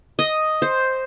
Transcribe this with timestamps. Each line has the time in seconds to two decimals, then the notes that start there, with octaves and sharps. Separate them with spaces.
0.19 D#5
0.62 C5